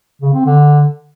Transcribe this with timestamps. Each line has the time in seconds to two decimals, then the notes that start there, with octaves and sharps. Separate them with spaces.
0.22 C#3
0.33 C4
0.45 D3